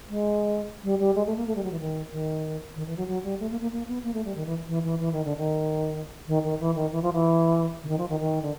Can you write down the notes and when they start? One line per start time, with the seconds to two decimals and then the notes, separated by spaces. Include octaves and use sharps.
0.09 G#3
0.83 G3
0.99 G3
1.15 G#3
1.26 A3
1.36 A#3
1.47 A3
1.55 G3
1.63 F#3
1.71 E3
1.80 D#3
2.12 D#3
2.76 D#3
2.86 E3
2.97 F#3
3.07 F#3
3.24 G3
3.40 A3
3.50 A#3
3.61 A#3
3.72 A#3
3.88 B3
4.04 A#3
4.14 A3
4.25 G3
4.36 D#3
4.46 E3
4.67 E3
4.84 E3
4.99 E3
5.12 D#3
5.24 D3
5.37 D#3
6.27 D#3
6.44 D#3
6.60 E3
6.75 D#3
6.92 E3
7.02 F3
7.13 E3
7.83 D3
7.88 D#3
7.98 F3
8.09 D#3
8.20 D#3
8.42 D3